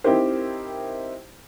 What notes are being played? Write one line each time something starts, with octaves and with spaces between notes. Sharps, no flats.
C4 D#4 E4 G4 A#4 C5